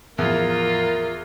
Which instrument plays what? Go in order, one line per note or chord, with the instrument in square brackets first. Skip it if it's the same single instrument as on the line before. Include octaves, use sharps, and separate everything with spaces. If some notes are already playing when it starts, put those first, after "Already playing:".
[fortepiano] E2 [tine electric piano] A2 F3 [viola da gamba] F4 [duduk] A#4